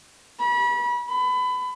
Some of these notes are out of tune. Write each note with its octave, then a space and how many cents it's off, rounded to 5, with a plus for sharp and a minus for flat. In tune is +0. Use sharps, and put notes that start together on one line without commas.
B5 -35
B5 +25